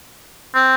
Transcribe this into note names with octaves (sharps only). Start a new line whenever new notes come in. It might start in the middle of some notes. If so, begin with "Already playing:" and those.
C4